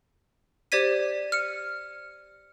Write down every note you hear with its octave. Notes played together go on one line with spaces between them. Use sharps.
G4 C5 D5 G#6 B6 D#7
F6 C#7